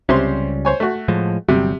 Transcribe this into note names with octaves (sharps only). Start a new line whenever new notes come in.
C#2 C3 G3 C#4 C5 C6
C5 C#5 G#5
A3 F#4
A2 F3 G#3
G1 C3 F#3 G3